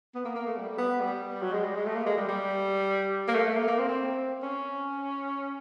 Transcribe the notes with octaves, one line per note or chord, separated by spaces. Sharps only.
B3
A#3
A#3
A3
G3
B3
G3
F#3
G#3
G3
G#3
A3
A#3
G#3
G3
G3
A#3
A3
A3
A#3
A#3
C4
C4
C#4